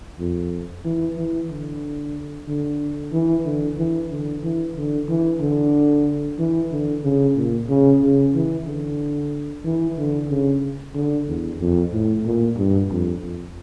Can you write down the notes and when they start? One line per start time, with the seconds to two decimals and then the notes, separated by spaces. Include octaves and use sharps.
0.20 F2
0.85 E3
1.18 E3
1.51 D3
2.48 D3
3.13 E3
3.46 D3
3.78 E3
4.11 D3
4.43 E3
4.76 D3
5.09 E3
5.41 D3
6.39 E3
6.72 D3
7.04 C#3
7.36 A#2
7.69 C#3
8.02 C#3
8.35 E3
8.67 D3
9.65 E3
9.98 D3
10.30 C#3
10.95 D3
11.28 E2
11.60 F2
11.93 A2
12.26 A#2
12.57 G2
12.91 F2
13.23 F2